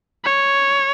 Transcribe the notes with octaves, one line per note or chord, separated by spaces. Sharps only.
C#5